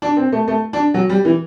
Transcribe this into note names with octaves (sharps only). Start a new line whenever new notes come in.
D4
C4
A3
A3
D4
F#3
G3
E3